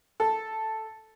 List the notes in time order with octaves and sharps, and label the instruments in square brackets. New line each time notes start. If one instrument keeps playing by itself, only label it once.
[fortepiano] A4